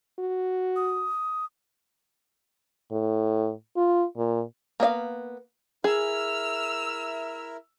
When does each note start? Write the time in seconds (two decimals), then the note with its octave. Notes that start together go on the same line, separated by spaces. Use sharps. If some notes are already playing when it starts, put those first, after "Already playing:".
0.19 F#4
0.76 D#6
2.92 A2
3.77 F4
4.17 A#2
4.80 A#3 B3 D#5 F5
5.84 E4 G#4 A#4 E5 E6 F6